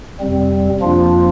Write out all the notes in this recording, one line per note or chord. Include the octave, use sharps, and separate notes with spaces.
F2 C3 G3 C4
F2 F3 A#3 D4 F4